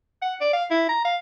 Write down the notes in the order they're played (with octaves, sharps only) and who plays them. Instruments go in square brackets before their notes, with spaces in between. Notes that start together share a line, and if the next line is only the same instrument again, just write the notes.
[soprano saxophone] F#5
D5
F5
E4
A#5
F5